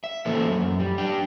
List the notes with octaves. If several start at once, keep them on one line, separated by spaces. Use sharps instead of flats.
E5
E3 A#3 C#4 D#4 A4 C5
F#2
G3
D4 G4